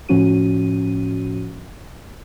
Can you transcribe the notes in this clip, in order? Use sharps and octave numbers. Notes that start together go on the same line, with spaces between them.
A2 F3 C#4 F#4 D#7